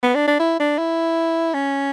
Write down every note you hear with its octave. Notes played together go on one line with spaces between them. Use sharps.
B3
D4
D4
E4
D4
E4
C#4